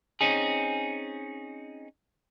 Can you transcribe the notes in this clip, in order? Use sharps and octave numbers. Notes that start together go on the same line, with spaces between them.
C4 C#4 D#4 G#4